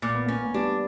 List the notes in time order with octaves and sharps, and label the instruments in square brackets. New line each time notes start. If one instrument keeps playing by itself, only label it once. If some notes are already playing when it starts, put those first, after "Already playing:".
[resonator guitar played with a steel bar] A#2 [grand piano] A#3
[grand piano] B3
[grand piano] A#3 [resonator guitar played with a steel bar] C#4
[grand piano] A#3
[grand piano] G3 B3 [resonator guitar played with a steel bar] D4